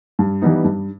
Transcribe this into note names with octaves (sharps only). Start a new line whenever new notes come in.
G2
E3 G3 B3 D#4
G2